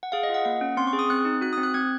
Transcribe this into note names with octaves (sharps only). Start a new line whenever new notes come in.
F#5
G#4 F5
D#5
F4
F#5
A#3 F#5
C#4
C4 C6
C#6
G#4
D#6
C4 F#6
D#4
F#4 F#6
C4 D#6
F#6
C4 G#6